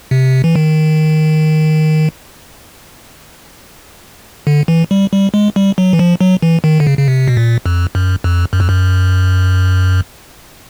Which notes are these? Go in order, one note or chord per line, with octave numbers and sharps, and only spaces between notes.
C3
E3
D#3
D3
E3
G3
G3
G#3
G3
F#3
E3
F3
F#3
E3
D#3
D3
C#3
C#3
C3
B2
A#2
F2
F#2
F2
F#2
F2
F#2